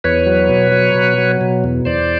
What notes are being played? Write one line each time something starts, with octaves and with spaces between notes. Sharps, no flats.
E2 B4 C#5
F#3
B2
F#3
B2
F#3
B2
E2
E2 C5 D5